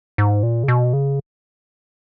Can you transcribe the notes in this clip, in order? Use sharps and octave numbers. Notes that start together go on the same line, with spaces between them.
G#2
A#2
C#3
B2
C#3